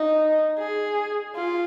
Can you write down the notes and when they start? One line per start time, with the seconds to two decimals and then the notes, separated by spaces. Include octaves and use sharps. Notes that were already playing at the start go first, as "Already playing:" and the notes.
Already playing: D#4
0.58 G#4
1.35 F4